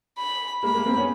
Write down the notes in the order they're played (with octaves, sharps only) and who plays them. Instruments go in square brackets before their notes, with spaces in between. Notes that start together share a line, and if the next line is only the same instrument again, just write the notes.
[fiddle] B5
[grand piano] G#3 A#3 [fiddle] B5
[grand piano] G#3 A#3
A#3 C4
B3 C#4